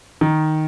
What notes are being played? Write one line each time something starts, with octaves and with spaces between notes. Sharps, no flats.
D#3